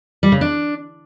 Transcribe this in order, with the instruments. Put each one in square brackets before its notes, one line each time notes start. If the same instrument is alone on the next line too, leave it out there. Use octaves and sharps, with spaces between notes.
[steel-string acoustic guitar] G3
C#3
D4